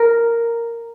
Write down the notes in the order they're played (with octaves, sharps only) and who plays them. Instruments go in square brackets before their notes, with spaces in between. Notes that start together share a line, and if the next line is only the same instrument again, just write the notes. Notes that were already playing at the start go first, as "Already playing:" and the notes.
Already playing: [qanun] A#4